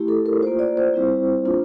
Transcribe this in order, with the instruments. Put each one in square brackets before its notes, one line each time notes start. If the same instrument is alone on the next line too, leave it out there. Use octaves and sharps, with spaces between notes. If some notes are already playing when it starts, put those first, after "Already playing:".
Already playing: [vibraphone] A3 E4 G4
A4
A#4
A#3 F4 C5
D5
C5
G3 C4 E4
A#3 D4 F4